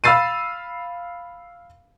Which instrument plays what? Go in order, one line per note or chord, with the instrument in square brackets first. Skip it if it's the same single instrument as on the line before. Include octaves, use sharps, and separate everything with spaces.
[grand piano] F5 B5 E6 A6 C7 D#7